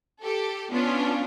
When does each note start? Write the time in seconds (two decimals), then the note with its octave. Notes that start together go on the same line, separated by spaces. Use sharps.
0.22 G4 A4
0.72 B3 C#4 D4 F4